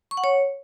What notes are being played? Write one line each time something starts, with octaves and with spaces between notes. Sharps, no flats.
C#6
F#5
C#5